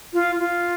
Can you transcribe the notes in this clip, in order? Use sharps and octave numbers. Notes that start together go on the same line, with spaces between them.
F4
F4